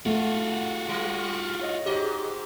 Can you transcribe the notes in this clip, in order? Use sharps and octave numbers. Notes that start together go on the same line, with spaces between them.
A3 F4 F#4
G3
C#5 D#5
G#2 F#4 G4 D#5